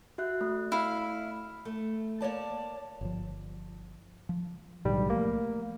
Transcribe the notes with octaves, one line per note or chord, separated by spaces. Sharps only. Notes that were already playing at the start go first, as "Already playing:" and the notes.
F#4 E5 F#6
A3
E4 F5
A3
A#3 C#5 D5 A5
G1 F3
F3
B1 A2 D3 G3
F3 A3 A#3